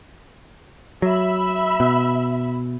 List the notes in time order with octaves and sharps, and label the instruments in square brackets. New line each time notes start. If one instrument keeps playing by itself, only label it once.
[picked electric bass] F#3 [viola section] E5 B5
[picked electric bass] B2